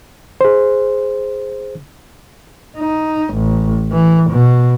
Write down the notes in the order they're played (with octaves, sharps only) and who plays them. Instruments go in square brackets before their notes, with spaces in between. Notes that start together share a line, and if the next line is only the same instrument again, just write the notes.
[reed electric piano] G#4 C5
[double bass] D#4
A1
E3
B2